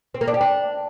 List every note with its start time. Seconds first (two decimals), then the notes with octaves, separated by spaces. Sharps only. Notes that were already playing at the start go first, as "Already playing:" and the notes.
0.14 C4
0.21 A#3
0.28 D4
0.34 G4
0.41 D4